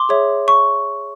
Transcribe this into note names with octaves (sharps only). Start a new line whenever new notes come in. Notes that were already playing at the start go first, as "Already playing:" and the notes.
Already playing: C6 D6
G#4 C#5 E5
C#6